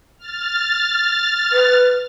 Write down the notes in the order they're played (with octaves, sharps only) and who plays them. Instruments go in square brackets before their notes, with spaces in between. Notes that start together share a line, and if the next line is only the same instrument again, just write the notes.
[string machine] F6 A6
[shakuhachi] B4